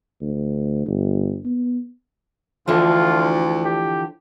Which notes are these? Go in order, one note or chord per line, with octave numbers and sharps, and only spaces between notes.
D2
G1
B3
D2 D3 E3 F3 F4
G4